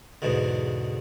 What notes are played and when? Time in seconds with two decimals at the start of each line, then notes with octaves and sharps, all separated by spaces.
0.22 E2 G#2 B2 D3